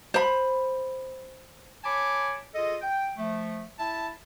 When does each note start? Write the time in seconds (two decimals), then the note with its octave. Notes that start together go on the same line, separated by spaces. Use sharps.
0.14 C5 B5
1.84 C#5 G#5 A5 B5 D6
2.54 F4 G#4 A4 D#5
2.82 G5
3.18 F3 A3
3.79 E4 E5 A5